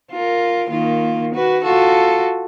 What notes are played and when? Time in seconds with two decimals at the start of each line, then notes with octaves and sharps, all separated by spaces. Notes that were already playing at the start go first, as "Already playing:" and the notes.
0.11 F4 A#4
0.69 D#3 A#3 F4
1.34 F#4 B4
1.64 F4 F#4 A4